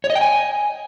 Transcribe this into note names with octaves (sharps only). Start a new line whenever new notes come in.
C#5
D#5
G5
G#5